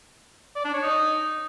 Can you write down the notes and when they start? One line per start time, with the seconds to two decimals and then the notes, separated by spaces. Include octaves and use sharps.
0.56 D5
0.65 D4
0.74 C#5
0.83 D#4